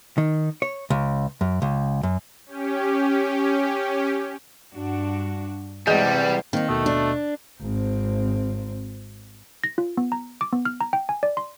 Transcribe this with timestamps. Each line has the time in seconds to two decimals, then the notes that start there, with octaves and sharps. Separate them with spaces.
0.18 D#3
0.62 C#5
0.90 C#2
1.41 F#2
1.62 C#2
2.03 F#2
2.46 C#4 G4
4.73 G2 D4 F#4
5.87 E2 C3 G3 G#3 G#4 D#5 G6
6.53 D#3 A#3 C4 D#4
6.69 D#2 B2 A3 D#5
6.86 D4
7.60 G#1 C4
9.64 A#6
9.78 F4
9.97 B3
10.12 A#5
10.41 D6
10.53 B3
10.65 F6
10.81 A#5
10.93 G5
11.09 G#5
11.23 D5
11.37 C6